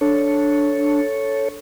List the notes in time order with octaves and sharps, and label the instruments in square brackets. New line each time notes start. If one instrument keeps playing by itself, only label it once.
[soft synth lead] D4 [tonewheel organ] A4 C#5